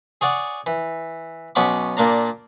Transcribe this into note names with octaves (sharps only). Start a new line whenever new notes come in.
G#4 C#5 D5 F#5
E3
B1 B2 C#4 F#5 B5 D6
A#2 A#3 D4 A#5